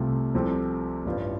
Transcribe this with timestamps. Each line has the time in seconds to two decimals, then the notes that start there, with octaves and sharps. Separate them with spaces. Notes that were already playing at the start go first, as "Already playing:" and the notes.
Already playing: C2 C3 A3 F4
0.34 C2 C3 F3 C4 A4
1.05 A1 G2 G3 F4